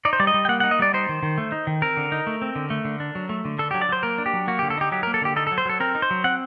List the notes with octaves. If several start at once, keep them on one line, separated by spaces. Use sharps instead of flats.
D#4 D5
C5
G3 D5
D#5
G3
G5
A#3 F#5
D#4 F#5
D#5
G3 D5
D#4 C5
D#3
D#3
A3
D#4
D#3
C4 A#4
D3
D#4
A3
C4
D3
A3
D3
D4
F#3
A3
D3
D4 A4
F#3 G4
D5
F#3 C5
A#3 A#4
D4
G4
F#3
A#3 F#4
D3 G4
A4
D#4 G4
F#3 G4
A#3 A#4
A4
D3 G4
D#4 A4
F#3 A4
C5
F#3 A4
C4 A#4
D#4
C5
F#3
C4 F#5